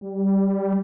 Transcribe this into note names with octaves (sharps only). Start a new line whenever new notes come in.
G3